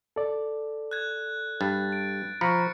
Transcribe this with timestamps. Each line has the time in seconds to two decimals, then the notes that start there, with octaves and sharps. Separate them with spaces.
0.16 A4 D5
0.91 F#6 G#6
1.61 G2 A6
1.92 D7
2.41 F3 A#5 B5 C#6 C#7